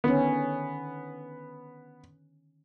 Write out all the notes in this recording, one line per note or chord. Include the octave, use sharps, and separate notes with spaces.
D3 D#3 B3 C#4